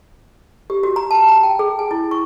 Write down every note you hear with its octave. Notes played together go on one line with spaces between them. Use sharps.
G4
F#4
A#5
A5
A#5
G5
G#4
G#5
E4
C#6